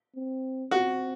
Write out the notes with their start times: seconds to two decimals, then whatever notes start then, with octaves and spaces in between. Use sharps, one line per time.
0.16 C4
0.71 C4 F#4